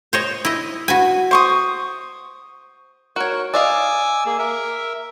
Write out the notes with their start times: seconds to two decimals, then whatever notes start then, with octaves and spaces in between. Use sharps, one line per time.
0.13 C5 C#5 D#5
0.45 E4 D#5
0.88 F#4 B4 G#5
1.31 C5 C#6 D#6
3.16 F#4 A#4 C#5
3.54 D5 D#5 F5 G#5 D6 E6
4.26 A#3 G#4
4.39 A#4 E5